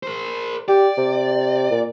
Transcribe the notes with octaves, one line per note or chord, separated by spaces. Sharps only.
A#4 C5
G4 D5
C3
A#2